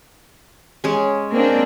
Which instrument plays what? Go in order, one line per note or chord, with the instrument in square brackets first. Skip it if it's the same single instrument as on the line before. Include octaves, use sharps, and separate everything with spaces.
[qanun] G#3 C#4
[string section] A#3 C4 D4